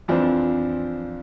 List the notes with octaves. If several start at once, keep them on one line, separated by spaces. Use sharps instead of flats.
F2 E3 F3 C4 D4